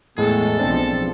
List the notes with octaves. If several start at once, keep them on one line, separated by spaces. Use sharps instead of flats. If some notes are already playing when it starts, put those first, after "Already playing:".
E2 A2 G#3 G#4 A4
B1 F3 C4 D4 A5